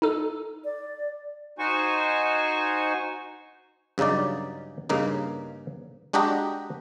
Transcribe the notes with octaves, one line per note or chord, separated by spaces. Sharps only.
D#4 A4
D5
D#4 F#4 C5 G#5 C#6
G2 C#3 F#3 D#4 D5
G2 C#3 A#3 D#4
G#3 D4 F#4 G4 D#5 A#5